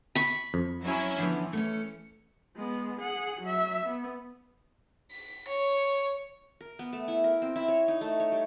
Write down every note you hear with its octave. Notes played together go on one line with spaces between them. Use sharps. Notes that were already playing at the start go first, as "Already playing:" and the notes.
B5 C#6
F2
F#3 C#4 E4
D3 E3 F3 B3
A3 C#4 C#7
G#3 B3
G#4 F#5
F#3 E5
B3
B6
C#5
A#4
B3
A3
E4
A#4
C4
E4
C#5
D#4
A3
C#5
G3